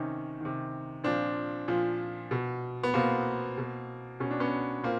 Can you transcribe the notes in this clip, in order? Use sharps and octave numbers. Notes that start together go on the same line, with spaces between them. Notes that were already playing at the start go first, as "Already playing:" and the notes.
Already playing: C3 D#3 C#4 D#4
C3 D#3
A#2 F3 C4 D4
A#2 F3
B2
B3
B2 A#3 C4
B2
B2 C#4
D4
B3 C#4
A#2 A#3 C4